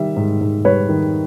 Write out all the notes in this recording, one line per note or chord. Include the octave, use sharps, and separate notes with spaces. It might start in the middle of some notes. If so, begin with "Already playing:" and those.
Already playing: D#3 G3 E5
G#2
G#2
G3 B4 C#5
D#3